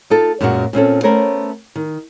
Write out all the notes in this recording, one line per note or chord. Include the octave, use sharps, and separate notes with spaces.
D#4 F4 A4
F#2 A#2 F#3 G#3 B3 F#4
A#2 C4 C#4 A4
A3 B3 C#4 A#4 C5 C#5
D#3